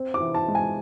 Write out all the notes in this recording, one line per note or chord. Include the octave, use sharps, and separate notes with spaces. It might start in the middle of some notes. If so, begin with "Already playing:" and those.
Already playing: C4
D6
E3
A5
G#3
G#5